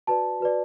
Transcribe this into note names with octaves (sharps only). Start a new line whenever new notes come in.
F#4 B4 D5 A5
F#4 B4 D5